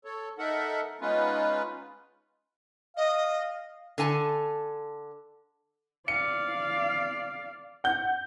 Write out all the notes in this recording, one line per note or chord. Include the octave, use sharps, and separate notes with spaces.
A4 C#5
D#4 A4 A#4 E5 F#5
G#3 B3 C#4 D#4 F4 B4
D#5 F5
D3 A4 G#5 A5
D5 F5 C#7
F#5 G6